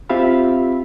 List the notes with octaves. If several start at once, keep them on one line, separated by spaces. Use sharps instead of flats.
C4 F4 G4 E5 F5 B5